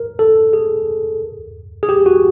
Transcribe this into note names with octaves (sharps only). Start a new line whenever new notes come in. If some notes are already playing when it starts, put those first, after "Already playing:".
Already playing: A#4
A4
G#4
G#4
G4
F#4